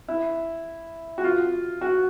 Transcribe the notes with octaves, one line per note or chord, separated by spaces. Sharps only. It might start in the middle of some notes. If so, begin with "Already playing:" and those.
E4
F#4
F4
F#4